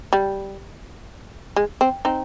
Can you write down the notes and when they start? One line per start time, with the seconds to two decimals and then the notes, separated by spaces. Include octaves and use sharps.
0.13 G3
1.56 G#3
1.81 C4
2.05 C4 D#4